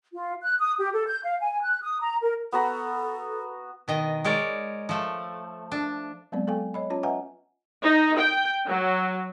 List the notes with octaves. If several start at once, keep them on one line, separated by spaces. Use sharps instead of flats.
F4
F#6
D#6
G4
A4
G6
F5
G#5
F#6
D#6
A#5
A#4
B3 F#4 A4 A#5
B2 D#3 D#5
G#3 A#4 C#5 D5
F3 A3
D4
F#3 G#3 B3 C4 D5
B3 A4 F5 G5 G#5
C#5 D#5 B5
C#4 F4 C#5 A5
B4 D#5 E5 F#5 G#5 A#5
D#4
G5
F#3